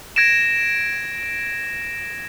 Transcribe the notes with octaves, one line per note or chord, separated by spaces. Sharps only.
G#6 A#6 D7 E7